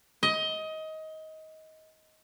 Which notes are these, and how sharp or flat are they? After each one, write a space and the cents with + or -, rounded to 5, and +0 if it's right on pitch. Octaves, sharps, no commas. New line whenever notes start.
D#5 +20